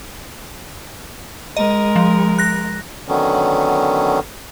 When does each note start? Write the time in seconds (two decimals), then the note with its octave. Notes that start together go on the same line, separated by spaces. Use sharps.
1.57 G#3 A#4 D#5
1.96 F3
2.38 F#6 A#6
3.08 D3 D#3 F#3 B3 C#4